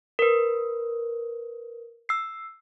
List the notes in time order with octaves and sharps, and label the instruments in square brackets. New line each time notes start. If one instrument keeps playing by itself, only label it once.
[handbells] A#4 B4
E6 C7